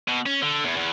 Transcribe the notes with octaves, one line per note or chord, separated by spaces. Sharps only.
B2
C#4
D3
E2
E2